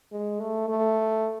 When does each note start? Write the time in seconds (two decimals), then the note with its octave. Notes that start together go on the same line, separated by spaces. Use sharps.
0.12 G#3
0.40 A3
0.69 A3